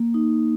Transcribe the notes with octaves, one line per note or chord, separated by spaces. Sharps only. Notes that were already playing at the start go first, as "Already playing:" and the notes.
Already playing: A#3
D#4